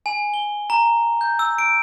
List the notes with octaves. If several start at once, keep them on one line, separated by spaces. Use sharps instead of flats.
G#5
G7
A#5
G6
E6
D7